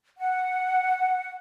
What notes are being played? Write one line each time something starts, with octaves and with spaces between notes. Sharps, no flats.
F#5